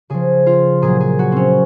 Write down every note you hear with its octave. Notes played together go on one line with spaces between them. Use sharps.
C#3 F3 G#4
F4
A#2 F#3 G#4
G#4
F#4
C4 C#4